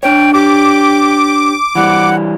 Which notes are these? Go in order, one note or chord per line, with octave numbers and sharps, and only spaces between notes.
D4 C#5 G5
G4 D6
E3 G3 F#5